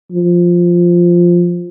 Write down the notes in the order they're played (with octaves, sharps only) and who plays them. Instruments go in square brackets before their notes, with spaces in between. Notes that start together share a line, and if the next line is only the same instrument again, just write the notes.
[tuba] F3